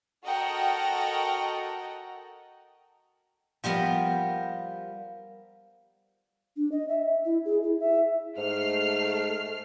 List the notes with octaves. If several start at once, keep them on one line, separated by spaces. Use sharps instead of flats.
F#4 A4 A#4 D#5 F#5 G5
F3 G3 B3 A#4
D4
D#5
E5
E4
G#4
E4
E5
G#2 A3 F6 C7